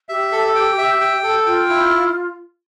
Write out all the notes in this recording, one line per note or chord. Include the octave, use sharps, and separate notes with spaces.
G4 E5
A4
G5
E5
G5
A4
F4 G5
E4